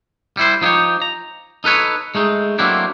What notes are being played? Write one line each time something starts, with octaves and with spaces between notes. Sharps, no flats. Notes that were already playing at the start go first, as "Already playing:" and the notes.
G3 E4 C5
F3 D#4 E4 G4 C#5
A#5
D#4 A4 B4 C#5
G#3 A3 D#4
F#3 A3 A#3 C4 D4 E4